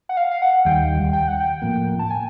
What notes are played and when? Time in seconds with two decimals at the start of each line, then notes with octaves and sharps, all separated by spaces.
0.09 F#5
0.17 F5
0.31 F5
0.42 F#5
0.65 D#2 D#3 G3 G5
1.13 G5
1.28 F#5
1.40 G5
1.62 A2 F3 A#3
1.99 A5
2.10 G#5